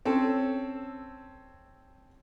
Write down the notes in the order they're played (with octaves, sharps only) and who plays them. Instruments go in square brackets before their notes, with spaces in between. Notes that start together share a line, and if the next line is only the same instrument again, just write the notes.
[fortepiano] C4 C#4 A4